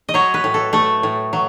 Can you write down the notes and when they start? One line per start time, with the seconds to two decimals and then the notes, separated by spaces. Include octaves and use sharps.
0.09 D#5
0.14 F#3 C#5
0.34 B4
0.44 A2
0.54 A4
0.73 A3 A4
1.03 A2
1.33 F#3